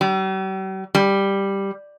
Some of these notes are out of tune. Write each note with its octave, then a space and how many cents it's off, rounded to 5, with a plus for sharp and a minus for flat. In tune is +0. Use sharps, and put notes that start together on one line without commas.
G3 -45
G3 +5